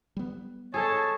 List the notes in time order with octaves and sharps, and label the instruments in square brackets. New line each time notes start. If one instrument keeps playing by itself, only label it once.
[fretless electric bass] G3 B3
[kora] G#4 A4 D#5 [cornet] C#5 [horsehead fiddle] A5